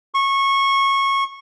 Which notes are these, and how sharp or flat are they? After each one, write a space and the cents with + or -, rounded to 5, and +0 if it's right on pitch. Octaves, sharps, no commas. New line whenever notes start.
C#6 -20